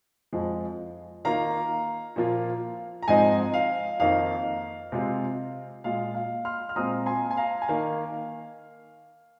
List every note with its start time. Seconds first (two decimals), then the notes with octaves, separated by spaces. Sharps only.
0.33 F2 F3 G#3
1.25 D#3 A#3 F4 F5 A#5
2.16 A#2 F3 A#3 F4
3.02 A#5
3.08 G#2 F3 G#3 C4 D#4 D#5 G#5
3.54 F5
4.00 F2 D#3 A#3 D#4 F5
4.92 C3 G#3 C4 F4
5.84 A#2 G#3 F4 F5
6.15 F5
6.45 C6 F6
6.69 F6
6.76 A#2 G#3 C4 F4 A#5 D#6
7.06 G#5 C6
7.31 G#5
7.37 F5 A#5
7.62 G#5
7.68 D#3 A#3 F5